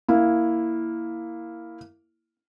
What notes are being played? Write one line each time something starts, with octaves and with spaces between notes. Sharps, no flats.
A#3 E4